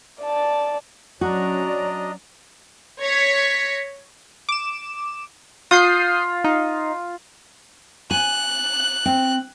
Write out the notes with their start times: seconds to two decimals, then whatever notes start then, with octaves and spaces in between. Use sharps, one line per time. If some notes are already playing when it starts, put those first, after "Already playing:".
0.22 D5 A5
1.21 F#3 C#4 D4 F#4 D5 D#5 A#5
3.01 C#5 G#6 A#6 B6 C#7
4.49 D6 E7
5.71 F4 D#6 G6 C7
6.44 D#4
8.11 G#5 F#6
9.06 C4